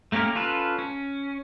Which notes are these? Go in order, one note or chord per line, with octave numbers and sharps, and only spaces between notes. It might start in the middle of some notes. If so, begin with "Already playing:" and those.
A3 A#3 C#4 G4 A#4
C#4 F4 A4 B4
C#4